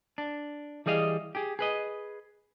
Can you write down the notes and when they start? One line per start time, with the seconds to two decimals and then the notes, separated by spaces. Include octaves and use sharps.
0.18 D4
0.86 E3 G3 G#4 D#5 F5
1.35 G4 G#4
1.59 G#4 B4 D#5